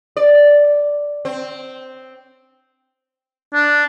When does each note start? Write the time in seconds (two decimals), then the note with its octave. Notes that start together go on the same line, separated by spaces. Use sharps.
0.17 D5
1.25 C4
3.54 D4